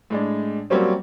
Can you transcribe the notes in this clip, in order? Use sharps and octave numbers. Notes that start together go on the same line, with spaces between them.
A2 G#3 D4
F#3 G3 A#3 C4 C#4